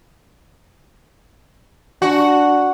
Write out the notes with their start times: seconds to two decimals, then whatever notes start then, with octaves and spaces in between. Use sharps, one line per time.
2.02 D4 F#4